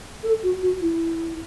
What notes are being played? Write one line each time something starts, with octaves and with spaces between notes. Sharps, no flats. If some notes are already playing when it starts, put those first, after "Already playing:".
A4
F#4
F#4
E4